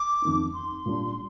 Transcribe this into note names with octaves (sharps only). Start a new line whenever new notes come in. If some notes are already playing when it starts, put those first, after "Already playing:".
Already playing: D6
F2 D#3 A#3 D#4
C6
A#2 G3 D4